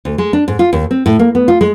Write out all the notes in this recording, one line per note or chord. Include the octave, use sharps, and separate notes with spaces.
D2
G#3
D4
G#2
F4
D#2
C4
A2
A#3
B3
F4
G#3